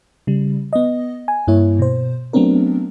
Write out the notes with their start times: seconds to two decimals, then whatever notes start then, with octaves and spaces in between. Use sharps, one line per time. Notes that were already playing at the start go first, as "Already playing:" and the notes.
0.27 C#3 G3
0.73 B3 D#5
1.28 G#5
1.48 G2 A#3 E4 C#5
1.79 B2 C5
2.33 F#3 A3 B3 C4 D4 A#4